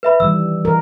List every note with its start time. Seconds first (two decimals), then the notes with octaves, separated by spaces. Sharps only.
0.03 B4 E5 B5
0.20 D#3 E3 G3 E6
0.65 E3 A#4